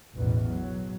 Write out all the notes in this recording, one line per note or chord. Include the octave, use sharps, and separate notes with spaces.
A1 E2 B2 E3
F#3